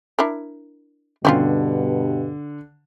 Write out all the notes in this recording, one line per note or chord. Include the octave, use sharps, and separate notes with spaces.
D4 E4 A#4
G2 B2 D3 C4 C#4 F4